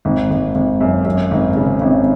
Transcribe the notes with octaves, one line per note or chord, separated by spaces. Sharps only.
G#1
G#1
G#1
F#2
F#2
G#1
C#3
G#1